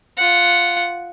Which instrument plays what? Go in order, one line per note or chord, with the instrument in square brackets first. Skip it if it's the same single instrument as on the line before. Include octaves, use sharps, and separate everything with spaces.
[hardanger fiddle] F4 F#5